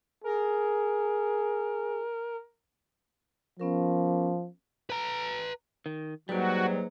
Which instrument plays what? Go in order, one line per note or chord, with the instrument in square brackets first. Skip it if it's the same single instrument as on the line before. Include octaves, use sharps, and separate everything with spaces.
[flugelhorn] G#4 [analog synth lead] A#4
[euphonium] F3 [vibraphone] B3 C#4 A#4
[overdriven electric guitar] B4 A#5
[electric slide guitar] D#3
[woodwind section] G#2 F#3 [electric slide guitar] G3 [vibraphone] A#3 B4 [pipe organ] F#4